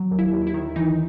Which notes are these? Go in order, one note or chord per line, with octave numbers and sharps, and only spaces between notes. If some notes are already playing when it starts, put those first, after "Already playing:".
Already playing: F#3
D#2
E4
D#2
E4
D#3
E3 D#4